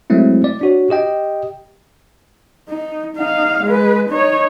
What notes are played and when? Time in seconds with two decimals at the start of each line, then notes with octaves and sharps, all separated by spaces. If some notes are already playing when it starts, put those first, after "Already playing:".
0.10 F#3 G#3 A3 C4 E4
0.44 D5
0.61 D4 F#4 C#5
0.90 G4 D#5 G5
2.69 D#4
3.16 D#4 F5
3.64 G#3 B4
4.10 D#4 C#5